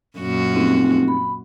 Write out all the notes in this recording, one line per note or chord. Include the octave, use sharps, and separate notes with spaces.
F#2 A#2 F#4
F1 C4
B5